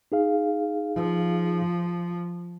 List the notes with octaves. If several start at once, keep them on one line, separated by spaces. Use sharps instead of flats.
D#4 G#4 F5
F3